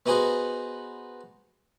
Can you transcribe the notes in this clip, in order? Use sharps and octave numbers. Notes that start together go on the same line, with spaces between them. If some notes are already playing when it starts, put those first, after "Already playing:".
B3 D#4 F#4 G#4 C5